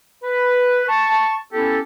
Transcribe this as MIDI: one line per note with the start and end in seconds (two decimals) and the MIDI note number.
0.23 0.83 71
0.88 1.36 81
0.88 1.36 85
1.53 1.78 59
1.53 1.78 61
1.53 1.78 64
1.53 1.78 67
1.53 1.78 69